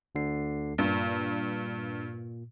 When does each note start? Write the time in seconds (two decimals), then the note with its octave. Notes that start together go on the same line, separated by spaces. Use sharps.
0.15 D2 D3 C7
0.78 G2 A#2